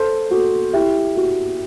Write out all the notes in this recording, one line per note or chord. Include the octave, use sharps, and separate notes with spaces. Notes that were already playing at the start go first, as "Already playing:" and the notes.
Already playing: A4 C5
F#4 A4
E4 G4
F#4